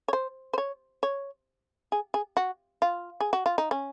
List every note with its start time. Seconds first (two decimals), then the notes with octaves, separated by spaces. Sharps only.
0.08 C#5
0.13 C5
0.53 C5
0.58 C#5
1.03 C#5
1.92 G#4
2.14 G#4
2.37 F#4
2.82 F4
3.20 G#4
3.33 F#4
3.46 F4
3.58 D#4
3.71 C#4